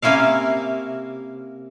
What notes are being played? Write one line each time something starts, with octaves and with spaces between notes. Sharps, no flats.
C3 A#3 C#4 E4 F5